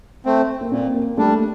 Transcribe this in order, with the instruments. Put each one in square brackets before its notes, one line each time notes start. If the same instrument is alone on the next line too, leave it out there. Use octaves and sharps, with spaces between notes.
[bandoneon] A3 C4
[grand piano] A#3
[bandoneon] A#2 [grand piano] C4
[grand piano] A#3
[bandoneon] G3 D4 [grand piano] A3